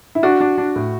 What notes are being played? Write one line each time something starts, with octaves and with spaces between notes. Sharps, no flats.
E4
D4 F#4
D4
D4
A2